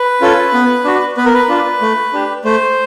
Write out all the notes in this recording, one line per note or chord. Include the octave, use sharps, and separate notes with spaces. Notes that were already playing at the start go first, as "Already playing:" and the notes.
Already playing: B4
C#4 F4 A4
B3
D4 F#4
B3 B4
A#4
B4
D4 F4
A3
D4 G4
A3 C5